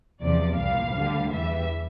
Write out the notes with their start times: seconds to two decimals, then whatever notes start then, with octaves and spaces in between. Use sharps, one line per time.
0.22 E2 C3 F3 D5
0.58 C2 A#2 G3 F5
0.95 D2 D3 G3
1.32 E2 E3 G3 E5